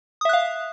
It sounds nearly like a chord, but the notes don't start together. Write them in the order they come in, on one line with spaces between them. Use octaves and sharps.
D#6 E5 F#6 F5